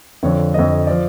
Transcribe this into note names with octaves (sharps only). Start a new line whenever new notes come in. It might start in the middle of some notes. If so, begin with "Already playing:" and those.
F2 D3 F3 C#5
F2 D3 F3 D#5
F3 D5